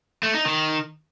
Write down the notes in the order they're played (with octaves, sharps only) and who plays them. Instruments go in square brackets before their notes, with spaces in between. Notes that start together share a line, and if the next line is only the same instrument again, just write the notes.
[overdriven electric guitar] A3
D#4
D#3